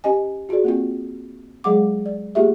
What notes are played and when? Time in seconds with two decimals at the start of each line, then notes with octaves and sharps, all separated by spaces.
0.04 C#4 G4 D#5 G#5
0.49 F4 F#4 G#4 A4 D5
0.64 A#3 C4 F4
1.64 F#3 G#3 G#4 F5 F#5 D6
2.06 D5
2.35 A3 A#3 F4 G4 G#4 E5